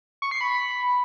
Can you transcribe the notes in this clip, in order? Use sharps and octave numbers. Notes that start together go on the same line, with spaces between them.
C#6
C7
B5